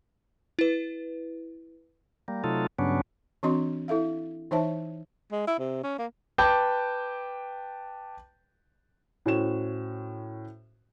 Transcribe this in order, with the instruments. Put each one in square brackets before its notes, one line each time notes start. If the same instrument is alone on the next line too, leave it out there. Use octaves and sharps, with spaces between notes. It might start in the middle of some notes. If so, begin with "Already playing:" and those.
[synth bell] E4 B4
[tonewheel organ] G3 A#3
C3 F#3 A3 D#4 F4 A4
G2 C#3 F#3 B3 C#4 D4
[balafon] E3 C4 D4 F#4 D#5 C6
E4 A4 E5 F5
E3 D#4 C5 C#5 E5 A5
[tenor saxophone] G#3
E4
C3
C#4
A#3
[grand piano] B4 G5 A5 D6 G6
[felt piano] A2 C#4 F#4 C5 E7